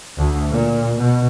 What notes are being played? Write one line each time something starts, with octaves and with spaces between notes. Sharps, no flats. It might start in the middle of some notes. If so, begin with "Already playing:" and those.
D2
A#2
B2